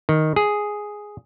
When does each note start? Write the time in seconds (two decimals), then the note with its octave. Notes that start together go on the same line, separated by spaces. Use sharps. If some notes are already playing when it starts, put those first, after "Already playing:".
0.09 D#3
0.36 G#4